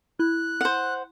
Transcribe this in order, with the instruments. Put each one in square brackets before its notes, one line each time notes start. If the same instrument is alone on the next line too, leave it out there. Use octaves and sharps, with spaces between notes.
[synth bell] E4 [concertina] F#6
[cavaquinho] C5 F#5